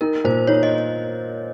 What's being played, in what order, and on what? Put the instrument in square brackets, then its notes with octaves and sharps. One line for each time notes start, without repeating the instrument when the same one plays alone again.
[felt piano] D#4 [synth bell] A#4
[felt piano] A#2 [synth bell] C5
[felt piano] D#4 [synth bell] C#5
[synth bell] D#5